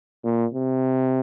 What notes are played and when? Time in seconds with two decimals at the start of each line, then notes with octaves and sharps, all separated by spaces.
0.25 A#2
0.54 C3